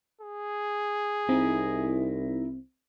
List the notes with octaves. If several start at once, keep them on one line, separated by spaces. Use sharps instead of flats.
G#4
C2 C4 D#4 E4